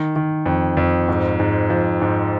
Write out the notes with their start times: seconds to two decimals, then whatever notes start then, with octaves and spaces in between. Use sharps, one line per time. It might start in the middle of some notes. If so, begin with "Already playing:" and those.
Already playing: D#3
0.16 D#3
0.46 F2
0.77 F2
1.08 G#2
1.40 G#2
1.70 F3
2.02 G#2